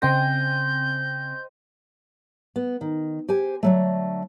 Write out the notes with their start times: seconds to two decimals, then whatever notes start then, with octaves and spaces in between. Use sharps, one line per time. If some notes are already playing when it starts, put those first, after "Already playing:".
0.02 C#3 C4 C5 D#5 G5 G6 A#6
2.56 B3
2.81 D#3
3.29 G4 C5 G#5
3.63 D3 F#3 A3